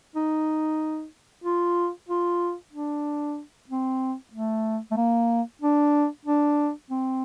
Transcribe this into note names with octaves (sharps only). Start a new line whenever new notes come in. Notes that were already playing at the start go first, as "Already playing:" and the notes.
D#4
F4
F4
D4
C4
A3
A3
A#3
D4
D4
C4